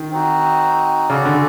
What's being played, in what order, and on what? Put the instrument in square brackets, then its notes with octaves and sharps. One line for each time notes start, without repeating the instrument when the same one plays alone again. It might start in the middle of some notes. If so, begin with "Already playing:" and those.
Already playing: [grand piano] D#3
[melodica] C4 D#4 F#4
[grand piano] C#3 [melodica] C#4 F#4 A4 D5
[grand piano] D3